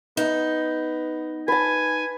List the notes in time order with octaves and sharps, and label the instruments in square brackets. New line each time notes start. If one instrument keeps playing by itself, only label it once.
[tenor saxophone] B3 [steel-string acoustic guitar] D#4
[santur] B4 A5 [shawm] G#5